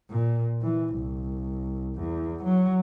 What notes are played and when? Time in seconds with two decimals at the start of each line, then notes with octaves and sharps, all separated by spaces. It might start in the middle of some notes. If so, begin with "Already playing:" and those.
0.10 A#2
0.62 E3
0.94 C2
1.96 E2
2.44 F#3